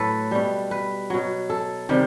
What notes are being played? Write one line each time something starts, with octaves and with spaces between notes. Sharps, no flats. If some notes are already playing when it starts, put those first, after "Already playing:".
Already playing: A2 F#3 A4 B4
B2 G3
B4
B2 F#3
A4
C3 D#3 G3